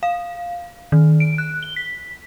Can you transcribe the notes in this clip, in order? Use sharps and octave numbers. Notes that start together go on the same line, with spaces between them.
F5
D#3
D7
F#6
G7
B6